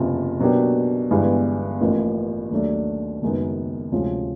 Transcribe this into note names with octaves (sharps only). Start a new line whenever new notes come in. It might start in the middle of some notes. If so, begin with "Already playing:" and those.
Already playing: F#1 E2 C3 F3
B2 F#3 A#3 D4 G4
G1 G2 E3 G#3 B3
A1 A2 F3 A#3
D#2 D#3 F#3 A3 D4
F#1 F#2 D#3 G#3 B3
D2 C3 F3 G#3 C#4